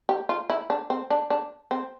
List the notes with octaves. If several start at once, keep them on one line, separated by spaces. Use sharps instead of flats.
G4
F4
E4
D4
C4
D4
D4
C4